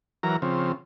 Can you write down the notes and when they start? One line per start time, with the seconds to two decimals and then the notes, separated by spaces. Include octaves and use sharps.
0.23 E3 F#3 A#4 A#5
0.42 C#3 F3 C4